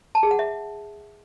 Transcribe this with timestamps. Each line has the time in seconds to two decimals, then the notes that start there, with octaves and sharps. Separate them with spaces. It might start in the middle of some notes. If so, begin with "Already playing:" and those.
0.15 A5
0.23 G#4
0.31 F#5
0.39 E5